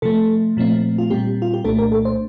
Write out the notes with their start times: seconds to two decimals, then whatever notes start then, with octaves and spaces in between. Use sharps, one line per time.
0.02 C3 F3 A3 A4
0.57 A#2 F3 A3 C4
0.98 F4
1.10 A#2 G3 C4 G4
1.42 F4
1.54 G4
1.64 C2 A#2 A3 D4 A4
1.79 A#4
1.92 A4
2.05 C5